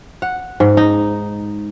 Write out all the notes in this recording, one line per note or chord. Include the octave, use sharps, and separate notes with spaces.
F#5
G#2
D#4